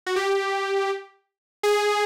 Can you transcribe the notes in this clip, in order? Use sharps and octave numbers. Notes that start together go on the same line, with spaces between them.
F#4
G4
G#4